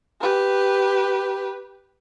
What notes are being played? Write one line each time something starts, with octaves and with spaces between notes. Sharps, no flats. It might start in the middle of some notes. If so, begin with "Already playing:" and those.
G4 B4